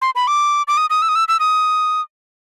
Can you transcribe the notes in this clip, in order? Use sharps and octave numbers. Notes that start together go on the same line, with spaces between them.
C6
B5
D6
D6
D#6
D#6
E6
D#6
E6
E6
D#6